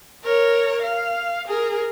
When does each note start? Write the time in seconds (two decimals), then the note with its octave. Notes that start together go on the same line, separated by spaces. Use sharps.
0.24 A#4 C#5
0.83 F5
1.47 G#4 A#4